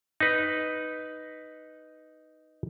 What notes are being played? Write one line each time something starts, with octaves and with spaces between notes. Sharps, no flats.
D#4 B4